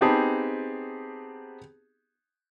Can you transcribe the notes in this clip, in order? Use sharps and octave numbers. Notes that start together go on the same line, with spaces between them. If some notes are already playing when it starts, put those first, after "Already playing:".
B3 C4 D#4 G4 G#4 A5